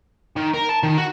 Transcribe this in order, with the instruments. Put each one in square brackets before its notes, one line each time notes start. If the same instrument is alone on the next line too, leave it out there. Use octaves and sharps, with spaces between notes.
[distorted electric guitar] D#3
A#4
A5
D#3
F#4